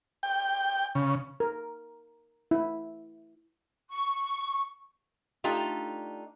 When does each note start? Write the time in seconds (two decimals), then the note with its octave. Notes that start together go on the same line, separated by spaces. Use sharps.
0.23 G5
0.95 C#3
1.40 A#4
2.51 E4
3.90 C#6
5.44 A3 D4 D#4 F4 G4